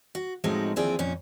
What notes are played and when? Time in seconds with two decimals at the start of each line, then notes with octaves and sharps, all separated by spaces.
0.15 F#4
0.44 A2 F3 G#3 C4 D#4 F#4
0.76 D#2 E3 F3 C4 G#4 D5
0.99 F2 A#2 C#4